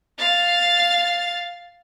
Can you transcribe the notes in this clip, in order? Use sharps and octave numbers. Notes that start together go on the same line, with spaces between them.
F5 A6